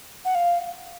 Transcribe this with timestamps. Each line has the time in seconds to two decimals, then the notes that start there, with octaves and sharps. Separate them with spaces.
0.25 F#5
0.35 F5